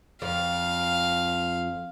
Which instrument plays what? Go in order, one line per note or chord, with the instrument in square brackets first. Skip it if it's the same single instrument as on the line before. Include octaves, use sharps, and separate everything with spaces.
[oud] F2 [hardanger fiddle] F5